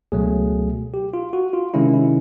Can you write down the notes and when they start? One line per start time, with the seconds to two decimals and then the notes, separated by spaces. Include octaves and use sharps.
0.12 C#2 B2 F#3 A3 G#4
0.94 G4
1.14 F4
1.33 F#4
1.53 F4
1.74 C3 D#3 G#3 C#4 E4
1.94 E4